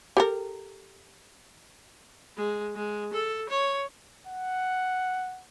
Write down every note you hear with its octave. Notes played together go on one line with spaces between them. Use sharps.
G4 A4 A#4
G#3
G#3
A4
C#5
F#5